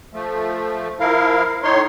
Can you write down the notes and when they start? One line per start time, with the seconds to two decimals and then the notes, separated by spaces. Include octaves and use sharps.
0.13 F3 A3
1.00 F3 E4 A#4 F5
1.63 A2 D#4 C#5 C6